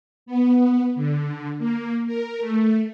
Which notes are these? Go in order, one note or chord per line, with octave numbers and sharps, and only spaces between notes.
B3
D3
A#3
A#4
A3